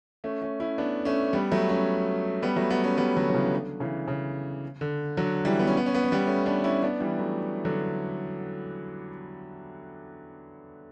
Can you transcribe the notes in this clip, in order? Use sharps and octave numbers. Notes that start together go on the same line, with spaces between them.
A3 C#4
A3 C#4
C#4 E4
B3 D4
A3 C#4
G3 B3
F#3 A3
A3 C#4
G3 B3
F#3 A3
G3 B3
A3 C#4
G3 B3
D3 F#3
F#3
C#3 E3
D3
C#3 E3
C#3
D3
D3 F#3
E3 G3
B3
C#4
B3
C#4
B3
C#4
G3 B3
A3 C#4
B3 D4
C#4 E4
B3 D4
E3 G3
F#3 A3
D3 F#3